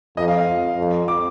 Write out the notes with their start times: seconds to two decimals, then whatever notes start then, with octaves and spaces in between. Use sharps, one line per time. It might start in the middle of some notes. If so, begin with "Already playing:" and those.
0.17 F2 D#5
0.28 F5
0.38 F5
0.77 F2
1.08 D6